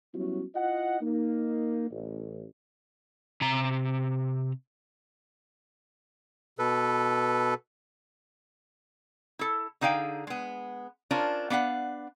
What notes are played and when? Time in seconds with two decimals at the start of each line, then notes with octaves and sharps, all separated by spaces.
0.13 F#3 G3 B3 C#4 E4 F#4
0.54 E4 F4 D#5 F#5
1.00 A#3 D#4
1.90 A1
3.41 C3 A#5
6.59 B2 A4 B4
9.39 E4 A4
9.81 D3 D#4 G#4 F5 G5
10.27 G#3 B3
11.11 C#4 D4 F4 A#4 C5
11.50 B3 D4 F5 F#5